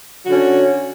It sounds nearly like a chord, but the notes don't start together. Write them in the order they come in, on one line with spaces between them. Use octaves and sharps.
F#4 D3 C#4